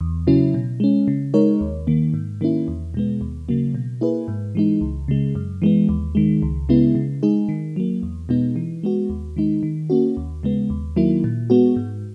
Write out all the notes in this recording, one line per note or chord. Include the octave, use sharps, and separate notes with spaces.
E2
C#3 F#3 C#4 E4
B2
G#3 C#4
C#3
G#3 D#4 A#4 C#5
D#2
D#3 A#3
G#2
D#3 A#3 C#4 E4
E2
B2 G#3 B3
D#2
C#3 F#3 A#3
B2
A#3 E4 G#4 B4
G#2
E3 G#3 D#4
C#2
C#3 G#3
F#2
E3 G#3 B3
D#2
D#3 G#3
C#2
C#3 G#3 B3 E4
C#3
G#3 D#4 G#4
D#3
F#3 A#3
E2
B2 G#3 B3 D#4
E3
G#3 B3 F#4
D#2
D#3 G#3 D#4
D#3
A#3 C#4 F#4
D#2
C#3 G#3 B3
D#2
D#3 F#3 A#3 E4
A#2
G#3 B3 F#4
G#2